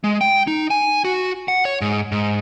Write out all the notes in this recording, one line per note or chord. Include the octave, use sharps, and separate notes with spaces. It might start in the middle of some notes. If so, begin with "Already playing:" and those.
G#3
G5
D#4
G#5
F#4
F#5
C#5
G#2
G#2